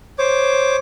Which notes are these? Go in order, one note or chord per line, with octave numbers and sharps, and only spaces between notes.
C5 C#5 D6